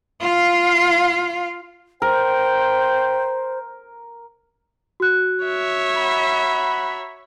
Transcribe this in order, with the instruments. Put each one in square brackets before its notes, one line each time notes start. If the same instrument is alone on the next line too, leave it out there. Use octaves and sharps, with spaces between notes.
[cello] F4 F5
[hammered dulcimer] A#4 [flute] C5 [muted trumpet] G5
[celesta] F#4 F#6
[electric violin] C#5 E5
[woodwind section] F#5 A#5 B5